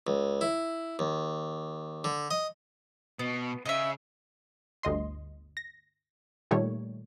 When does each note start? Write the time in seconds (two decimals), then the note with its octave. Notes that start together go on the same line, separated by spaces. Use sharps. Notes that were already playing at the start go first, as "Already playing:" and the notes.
0.07 C#2
0.41 E4
0.99 D#2
2.04 D3
2.31 D#5
3.19 B2 B3
3.65 C#3 D#5 E5
4.83 G1 D2 D#5 C6
5.57 A#6
6.51 A#2 D#3 G3 A3 C#5